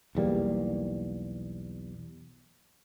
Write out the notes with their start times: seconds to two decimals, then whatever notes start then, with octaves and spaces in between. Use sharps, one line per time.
0.15 B1 E2 G3 A#3